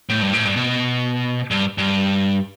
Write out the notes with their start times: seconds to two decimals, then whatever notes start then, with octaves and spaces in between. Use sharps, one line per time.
0.09 A2
0.22 G2
0.33 A2
0.45 G2
0.56 B2
1.51 G2
1.78 G2